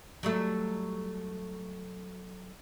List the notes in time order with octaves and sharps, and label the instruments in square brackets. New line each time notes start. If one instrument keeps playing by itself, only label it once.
[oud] F#3 G3 A3